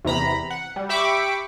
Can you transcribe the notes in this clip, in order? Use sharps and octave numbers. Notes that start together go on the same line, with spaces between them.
E2 C3 A#5 B5
F#5
G3
G4 E5 B5 C#6 D6